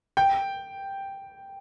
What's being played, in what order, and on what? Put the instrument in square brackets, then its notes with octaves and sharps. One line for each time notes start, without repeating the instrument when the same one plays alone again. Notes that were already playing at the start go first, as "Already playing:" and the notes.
[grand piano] G5